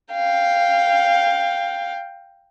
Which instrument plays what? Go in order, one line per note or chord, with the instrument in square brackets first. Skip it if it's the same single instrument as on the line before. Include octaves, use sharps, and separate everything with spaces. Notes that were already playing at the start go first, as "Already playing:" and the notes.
[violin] F5 G5